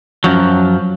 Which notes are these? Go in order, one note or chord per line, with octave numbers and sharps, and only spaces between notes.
F#2 F3 F#3